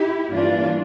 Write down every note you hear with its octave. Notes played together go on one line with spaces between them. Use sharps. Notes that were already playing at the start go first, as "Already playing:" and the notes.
Already playing: E4 G4
G2 E3 A#3 D4 F4